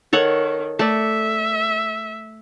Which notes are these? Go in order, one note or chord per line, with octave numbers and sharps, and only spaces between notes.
D#3 A4 C#5 F#5
A3 D5 E5